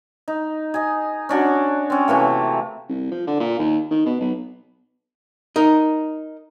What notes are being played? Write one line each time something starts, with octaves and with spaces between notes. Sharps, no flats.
D#4
G#4 D#5
C#4 D4 F#4
C4 C#4
C3 E3 A3 A#3
C2
F3
D3
A#2
D#2
D#3
B2
B1
D#4 A#4